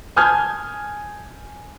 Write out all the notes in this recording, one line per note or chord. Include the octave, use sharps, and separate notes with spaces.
G#5 A5 D#6 F6 G6 G#6